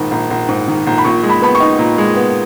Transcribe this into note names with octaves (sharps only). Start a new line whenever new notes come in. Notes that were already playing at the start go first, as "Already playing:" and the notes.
Already playing: A#1 G#2 D#3 B5
A#1
A#1
G#2
D#3
A#1
B5
A#2 C#6
G#3
B5
B3 B5
C#6
D#4
A#2
G#3
B3